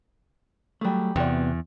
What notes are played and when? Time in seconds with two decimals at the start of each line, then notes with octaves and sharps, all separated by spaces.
0.81 F#3 G3 A3 G#4
1.16 E2 C3 B3 C4 F#4 D5